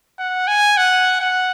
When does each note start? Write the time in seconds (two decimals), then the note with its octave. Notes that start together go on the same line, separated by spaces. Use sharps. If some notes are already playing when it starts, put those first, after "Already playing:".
0.19 F#5
0.47 G#5
0.77 F#5
1.21 F#5